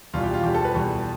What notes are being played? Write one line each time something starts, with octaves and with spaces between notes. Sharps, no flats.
E2 B2 G3 F4
G4
F4
E2 B2 G3 G4
A4
B4
E2 B2 G3